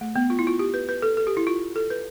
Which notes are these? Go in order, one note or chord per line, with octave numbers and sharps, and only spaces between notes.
A3
B3
F4
E4
F4
G4
B4
B4
A4
A4
G4
E4
F4
A4
B4